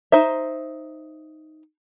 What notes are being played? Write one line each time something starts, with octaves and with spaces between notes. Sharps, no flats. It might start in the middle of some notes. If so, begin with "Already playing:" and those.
D#4 C5 E5